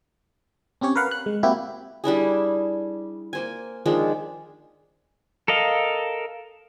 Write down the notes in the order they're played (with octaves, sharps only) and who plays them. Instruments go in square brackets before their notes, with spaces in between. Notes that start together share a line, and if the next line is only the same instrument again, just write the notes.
[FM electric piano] C4 C#4 G4 C#5
A#4 B4 F5 F#5 B5
F#6
G#3
A#3 C4 E4 F#4 G4
[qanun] G3 D4 E4 G#4
A#3 C5 G#5
D#3 F3 G#3 D4
[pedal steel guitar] A4 A#4 D#5 F5